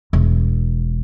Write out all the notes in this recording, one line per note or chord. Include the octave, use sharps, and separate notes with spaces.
E1